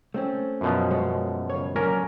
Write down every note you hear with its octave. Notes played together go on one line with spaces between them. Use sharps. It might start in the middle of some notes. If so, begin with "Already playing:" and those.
A3 C4 C#4
F#2 B2 F3
G#3 C#5
C#3 C#5
D3 F#3 A#3 C#4 A#4